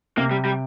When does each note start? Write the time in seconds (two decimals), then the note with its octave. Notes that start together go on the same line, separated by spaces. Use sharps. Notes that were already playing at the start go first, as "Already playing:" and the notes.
0.17 C3 A#3
0.31 G3
0.45 G3